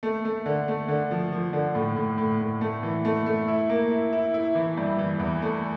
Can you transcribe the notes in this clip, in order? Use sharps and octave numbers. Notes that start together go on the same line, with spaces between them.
A3
A3
D3
A3
D3
F3
F3
D3
A2
A2
A2
A2
A3
E3
A3
A3
E4
A#3
E4
E4
E4
E3
G2
E3
E2
A3